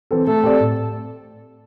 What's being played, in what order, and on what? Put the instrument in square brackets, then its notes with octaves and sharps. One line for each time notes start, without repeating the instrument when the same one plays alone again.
[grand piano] E3 C4 A4
[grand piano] A3 [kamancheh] A4
[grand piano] C4 G4 D5
A2